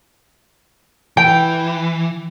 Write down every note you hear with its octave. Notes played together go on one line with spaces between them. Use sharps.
E3 G5